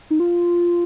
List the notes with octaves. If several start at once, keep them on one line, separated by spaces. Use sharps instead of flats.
D#4
F4